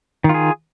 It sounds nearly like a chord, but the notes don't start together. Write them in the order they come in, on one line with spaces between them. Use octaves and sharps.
D#3 F4 G#4